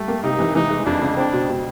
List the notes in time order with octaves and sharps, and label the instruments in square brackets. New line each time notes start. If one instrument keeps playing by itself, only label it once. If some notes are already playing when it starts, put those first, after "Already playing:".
Already playing: [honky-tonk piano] G3 [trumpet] A3
[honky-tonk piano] A#3
[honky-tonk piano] C3 [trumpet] D#4
[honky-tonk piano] E3
[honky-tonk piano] E3 [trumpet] D#4
[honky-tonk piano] G#3
[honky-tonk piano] F2 [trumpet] D4
[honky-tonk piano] C#3
[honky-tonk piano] C4 [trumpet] D4
[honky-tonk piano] B2
B2